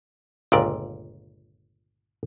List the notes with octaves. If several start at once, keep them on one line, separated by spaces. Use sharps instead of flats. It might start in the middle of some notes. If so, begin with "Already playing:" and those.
G1 C#2 A#2 D5